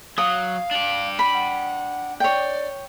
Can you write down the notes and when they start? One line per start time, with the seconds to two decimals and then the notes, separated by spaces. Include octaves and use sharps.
0.18 F#3 F5 D#6
0.71 D4 G4
1.19 B5
1.34 F#5
2.20 C#5 D5 G5